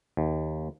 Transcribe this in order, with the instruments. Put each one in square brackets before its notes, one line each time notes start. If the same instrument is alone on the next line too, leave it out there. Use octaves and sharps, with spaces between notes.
[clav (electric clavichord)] D#2